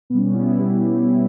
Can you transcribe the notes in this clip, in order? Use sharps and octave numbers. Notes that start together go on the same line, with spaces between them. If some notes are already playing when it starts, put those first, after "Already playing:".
B2 G3 B3 C#4
B3
E4
G4
G4
E4
E4